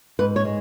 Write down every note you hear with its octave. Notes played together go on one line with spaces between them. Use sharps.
G#2 B4
C#5
G#3